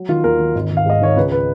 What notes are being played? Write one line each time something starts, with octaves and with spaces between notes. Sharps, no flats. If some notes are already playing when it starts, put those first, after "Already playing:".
Already playing: F#3
D#3 F4
D#2 A#4
D#3
G#1
G#1
F5
G#2 D#5
D#3 C#5
C#2 B4
B4